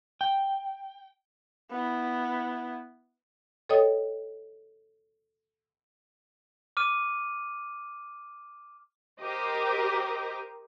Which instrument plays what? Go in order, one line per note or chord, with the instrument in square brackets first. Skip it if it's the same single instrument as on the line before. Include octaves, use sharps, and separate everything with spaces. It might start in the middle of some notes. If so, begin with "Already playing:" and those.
[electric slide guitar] G5
[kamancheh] B3 E4
[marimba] A4 C#5 D#5 G5 D#6
[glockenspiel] D6 F6 D#7
[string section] G4 A#4 C5 D#5 D6